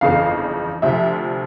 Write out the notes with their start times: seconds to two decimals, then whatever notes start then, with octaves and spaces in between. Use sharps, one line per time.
0.01 G1 F2 C#3 E3 F5
0.82 D2 C3 F3 E5